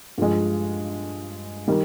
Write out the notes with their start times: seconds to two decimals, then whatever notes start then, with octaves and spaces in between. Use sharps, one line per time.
0.18 G2 F3 G#3
1.68 D#3 G3